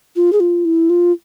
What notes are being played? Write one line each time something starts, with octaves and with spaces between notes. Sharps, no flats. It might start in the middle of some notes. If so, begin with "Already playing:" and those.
F4
G#4
F4
E4
F4